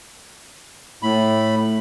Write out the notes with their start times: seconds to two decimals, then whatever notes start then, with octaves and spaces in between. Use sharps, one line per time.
1.03 A2 A3 B5